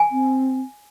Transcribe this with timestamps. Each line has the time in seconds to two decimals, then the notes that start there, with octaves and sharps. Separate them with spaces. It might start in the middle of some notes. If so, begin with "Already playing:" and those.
Already playing: G#5
0.12 C4